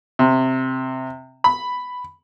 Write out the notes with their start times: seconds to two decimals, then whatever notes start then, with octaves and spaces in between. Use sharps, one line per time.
0.19 C3
1.44 B5